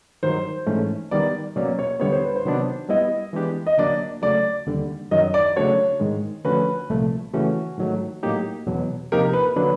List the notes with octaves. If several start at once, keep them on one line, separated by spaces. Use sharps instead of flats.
G2 D#3 F#3 C5
G#2 E3 A3 C#4
D#3 G3 B3 D5
B2 F#3 A#3 C#4 D5
C#5
D3 G3 B3 C#5
C5
B4
C5
C3 D#3 F#3 B3 D4
G3 B3 E4 D#5
E3 G#3 B3 D4 G4
D#5
D3 F#3 A#3 D4 D5
C#3 F#3 A3 D5
D#2 D3 G3
F#2 D#3 F#3 D#5
D5
C#3 F#3 A3 D4 F#4 C#5
G#2 D#3 G#3
D3 F3 A3 C#4 F#4 B4
C2 A#2 F3 A3
C#3 E3 A3 C#4 F#4
G#2 D#3 F#3 A3
A2 F#3 A#3 D#4 G4
E2 B2 F#3
C3 F3 A#3 D#4 G4 A#4
B4
D3 F#3 A#3 D4 B4